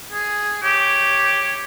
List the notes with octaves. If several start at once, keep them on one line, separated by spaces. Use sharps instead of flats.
G#4
G4 C#5